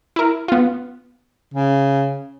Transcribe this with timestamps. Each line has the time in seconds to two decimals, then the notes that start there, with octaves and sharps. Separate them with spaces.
0.16 E4 A#4
0.48 B3 F4
1.54 C#3